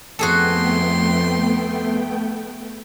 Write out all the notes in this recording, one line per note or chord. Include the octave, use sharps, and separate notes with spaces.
F2 A3 B3 F#4 G#4 A4 G5 C6